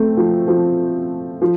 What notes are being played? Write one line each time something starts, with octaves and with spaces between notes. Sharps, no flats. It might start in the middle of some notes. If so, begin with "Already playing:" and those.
Already playing: A3 C4
F3
F3
F3